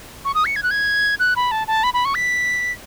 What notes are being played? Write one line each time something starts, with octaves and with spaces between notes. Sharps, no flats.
C#6
D#6
C#7
G#6
F#6
G#6
F#6
B5
A5
A5
B5
B5
C#6
B6